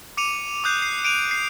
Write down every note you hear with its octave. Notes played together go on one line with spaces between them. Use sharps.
D6 C#7 D#7 F7
D6 D#6 F#6 G6 C7
C7
D7 D#7 F7
C7